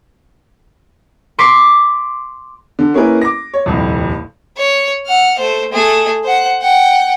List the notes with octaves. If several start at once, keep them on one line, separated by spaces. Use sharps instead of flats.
C6 D6 B6 D7
D3
A#3 C#4 E4 G#4 A#4 B4
D6 A#6
C#5
D#1 C2 F2
C#5
F#5 F6
A3 C5
A3 G#4
C5 F#5
F#5 G5